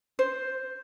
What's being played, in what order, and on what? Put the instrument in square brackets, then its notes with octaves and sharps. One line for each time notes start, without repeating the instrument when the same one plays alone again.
[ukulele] C5